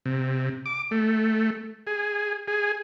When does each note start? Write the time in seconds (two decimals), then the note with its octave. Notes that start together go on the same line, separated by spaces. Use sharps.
0.06 C3
0.66 D6
0.91 A3
1.87 G#4
2.48 G#4